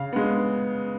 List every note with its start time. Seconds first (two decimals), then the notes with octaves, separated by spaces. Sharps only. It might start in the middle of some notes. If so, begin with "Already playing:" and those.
Already playing: C#3 F5
0.13 G#3 B3